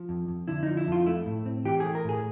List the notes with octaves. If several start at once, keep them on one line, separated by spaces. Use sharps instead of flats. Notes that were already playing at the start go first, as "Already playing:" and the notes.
Already playing: F3
F2
F2
D3 E4
F3 D#4
E4
F2 F4
A3 E4
A2
C4
E3 G4
A3 G#4
A#4
A2 G#4